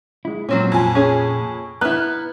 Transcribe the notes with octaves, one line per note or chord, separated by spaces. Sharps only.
G#3 E4
A#2 F#3 C4 C#4
F2 G#5
C#4 G#4
B3 E4 A#5 F6 F#6